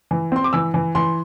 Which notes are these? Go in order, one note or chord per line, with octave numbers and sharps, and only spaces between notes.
E3
C4 C6
D6
E3 E6
E3
E3 C6